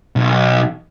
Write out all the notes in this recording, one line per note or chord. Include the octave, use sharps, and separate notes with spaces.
B1